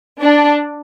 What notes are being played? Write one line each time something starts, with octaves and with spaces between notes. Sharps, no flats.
D4